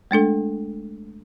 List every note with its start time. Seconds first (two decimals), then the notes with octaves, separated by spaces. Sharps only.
0.11 G#3 A3 D4 A4